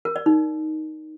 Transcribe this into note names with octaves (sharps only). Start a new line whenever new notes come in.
A#4
D5
D#4